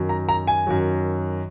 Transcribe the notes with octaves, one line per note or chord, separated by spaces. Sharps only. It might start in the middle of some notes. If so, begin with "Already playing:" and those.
Already playing: F#2 D#3 F#3
A#5
A#5
G#5
F#2 D#3 F#3